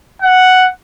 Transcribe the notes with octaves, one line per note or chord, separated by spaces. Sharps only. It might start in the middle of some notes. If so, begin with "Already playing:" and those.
F#5